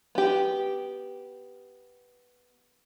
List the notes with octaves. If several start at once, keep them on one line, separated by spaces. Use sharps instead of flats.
B3 G4